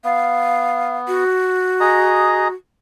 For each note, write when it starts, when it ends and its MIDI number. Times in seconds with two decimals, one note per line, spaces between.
0.04 1.24 59
0.04 0.97 77
1.08 2.53 66
1.80 2.48 68
1.80 2.48 75
1.80 2.48 82